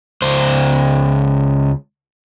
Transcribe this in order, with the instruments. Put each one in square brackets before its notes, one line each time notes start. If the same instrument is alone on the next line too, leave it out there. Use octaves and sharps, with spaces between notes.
[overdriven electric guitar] C#2 C5